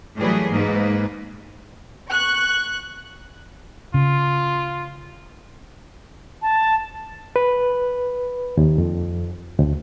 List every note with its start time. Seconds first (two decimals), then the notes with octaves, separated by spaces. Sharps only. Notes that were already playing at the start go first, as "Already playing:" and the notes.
0.16 A2 E3 F#3 G3 G#4 B4
0.50 G#2 A#3 B4
2.12 C#6 F#6
3.94 C#3 F4
6.42 A5
7.36 B4
8.57 D#2
8.78 F2
9.59 D2